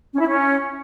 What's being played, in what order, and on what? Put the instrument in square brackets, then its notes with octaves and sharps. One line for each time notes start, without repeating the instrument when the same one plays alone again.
[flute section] C#4
E4
C#4